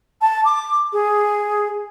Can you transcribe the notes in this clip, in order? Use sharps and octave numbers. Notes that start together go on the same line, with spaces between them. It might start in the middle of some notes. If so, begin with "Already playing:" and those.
A5
D6
G#4